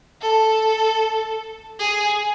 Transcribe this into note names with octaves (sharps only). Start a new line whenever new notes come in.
A4
G#4